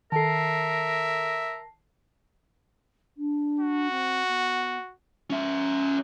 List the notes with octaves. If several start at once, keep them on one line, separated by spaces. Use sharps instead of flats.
D#3 A4 A#4 E5 A5 C7
D4
F#4
C4
B3
C#4 E5